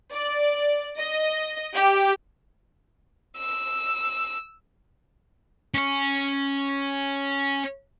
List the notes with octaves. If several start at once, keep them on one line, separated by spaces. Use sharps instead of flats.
D5
D#5
G4
E6
C#4 C#5